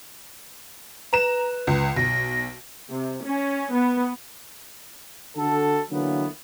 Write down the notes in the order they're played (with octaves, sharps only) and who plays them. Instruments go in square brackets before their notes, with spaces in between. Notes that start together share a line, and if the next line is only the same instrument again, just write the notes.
[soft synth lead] B4 [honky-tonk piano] A#5 E7
[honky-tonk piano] C#2
[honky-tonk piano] B1 [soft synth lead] A#6
[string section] C3
C#4
B3
[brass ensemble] D3 F#4 A4
D3 E3 F#3 A#3 B3